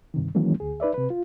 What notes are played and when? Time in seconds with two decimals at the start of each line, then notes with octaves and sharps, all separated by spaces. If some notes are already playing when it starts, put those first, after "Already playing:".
0.14 G2 C3 D#3
0.35 D#3 E3 F#3 G#3 A#3 C#4
0.60 D2 G#4
0.80 D#4 B4 D5 E5
0.94 C3 B4
1.10 F4